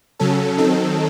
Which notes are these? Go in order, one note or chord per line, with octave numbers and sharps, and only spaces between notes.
C#3 F#3 C#4 A4
D#3 F#3 C4 D#4 A4